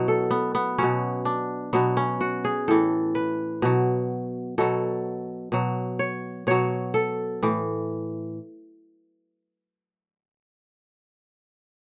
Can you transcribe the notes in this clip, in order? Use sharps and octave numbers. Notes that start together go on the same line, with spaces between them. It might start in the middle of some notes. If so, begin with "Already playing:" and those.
Already playing: B2 F#3 E4
A4
B3
B3
B2 F#3 C#4
D4
B2 F#3 B3
C#4
F#4
G#4
A2 E3 A4
B4
B2 F#3
B2 F#3 A4
B2 F#3
C#5
B2 F#3 C#5
A4
A2 E3